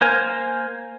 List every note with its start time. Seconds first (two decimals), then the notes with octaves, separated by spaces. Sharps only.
0.01 A#3 A#4 C5 G#5 F6